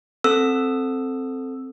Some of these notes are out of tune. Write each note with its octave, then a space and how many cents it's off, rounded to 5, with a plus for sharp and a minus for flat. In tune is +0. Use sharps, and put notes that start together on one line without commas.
C4 +0 A4 +0 E6 +0